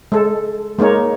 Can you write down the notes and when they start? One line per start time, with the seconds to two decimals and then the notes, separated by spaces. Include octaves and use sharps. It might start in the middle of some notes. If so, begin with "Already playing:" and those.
0.12 G#3 A4
0.79 G#3 A#3 D#4 C#5